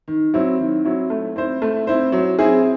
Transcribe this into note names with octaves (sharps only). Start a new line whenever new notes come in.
D#3
F#3 C4 E4
D#3
F#3 C4 E4
A3
C4 E4 C5
A3
C4 E4 C5
F#3
C4 E4 G#4